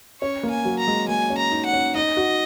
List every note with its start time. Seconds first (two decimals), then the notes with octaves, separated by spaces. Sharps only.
0.21 C#4 C#5
0.43 A#3
0.50 G#5
0.65 F#3
0.79 A#5
0.87 G#3
1.08 A#3 G#5
1.30 C#4
1.38 A#5
1.51 D#4
1.66 F#5
1.73 C#4
1.95 D#4 D#5
2.17 F#4